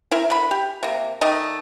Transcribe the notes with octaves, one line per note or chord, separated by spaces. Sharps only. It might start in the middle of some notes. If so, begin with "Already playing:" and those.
E4 A#4 E5
D3 B5
G4
C3 A#3
D#3 A3 D5 D#5